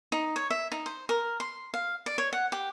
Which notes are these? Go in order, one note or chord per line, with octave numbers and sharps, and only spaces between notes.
D#4
C#5
E5
D#4
C5
A#4
C6
F5
D5
C#5
F#5
G4